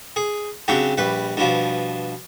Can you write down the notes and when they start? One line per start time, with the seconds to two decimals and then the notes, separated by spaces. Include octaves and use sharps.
0.16 G#4
0.68 C#3 F#3 C4 D4 G4
0.98 A#1 G3 B4
1.37 G2 B2 F3